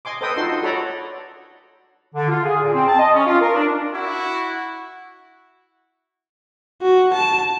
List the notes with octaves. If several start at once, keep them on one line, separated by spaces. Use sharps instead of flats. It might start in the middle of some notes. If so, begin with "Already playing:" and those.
D#5 G#5 C6 D6
A4 B4 C5 D#5 G5 D#6
D4 D#4 F4 F#4 A4 C6
F#4 A4 C#5 D5 A#5 B5
D3
F4
G#4
A#2
C4
A5
D#5
C#4
F4
A#4
D4
E4 F#4 F#5
F#4
A5